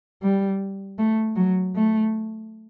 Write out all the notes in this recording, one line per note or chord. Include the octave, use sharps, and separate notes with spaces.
G3
A3
F#3
A3